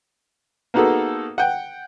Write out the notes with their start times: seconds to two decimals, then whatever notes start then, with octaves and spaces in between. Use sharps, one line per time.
0.74 A#3 B3 D#4 F#4 G#4 A4
1.38 F#5 G5